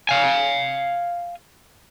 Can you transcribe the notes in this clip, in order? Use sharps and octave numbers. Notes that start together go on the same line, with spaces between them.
F5 G#5